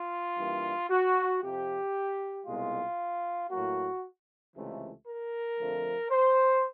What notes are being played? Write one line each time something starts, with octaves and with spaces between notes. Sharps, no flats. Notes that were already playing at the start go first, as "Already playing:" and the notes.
Already playing: F4
G2 E3 G3 A#3
F#4
F2 C3 F3 G4
C2 B2 G#3 F4
A2 F#3 A#3 F#4
C#2 C3 E3 A3
A#4
F2 D3 F3 A3
C5